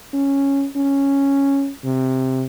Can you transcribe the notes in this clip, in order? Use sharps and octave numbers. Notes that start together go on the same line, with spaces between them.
C#4
C#4
C3